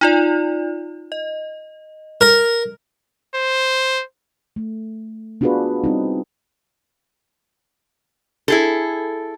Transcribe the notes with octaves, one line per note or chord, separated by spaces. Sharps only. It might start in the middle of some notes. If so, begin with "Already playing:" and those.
D#4 F4 D5
D#5
A#4
C5
A3
B3 D4 F4 F#4 G#4 B4
G3 C4 D#4
E4 G#4 A4